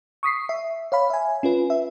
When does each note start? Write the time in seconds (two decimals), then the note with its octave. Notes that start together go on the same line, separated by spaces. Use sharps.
0.23 C#6 D#6 B6 C7
0.49 E5
0.92 C#5 F5 B5
1.10 E5 G#5
1.43 C#4 F4 B4
1.70 E5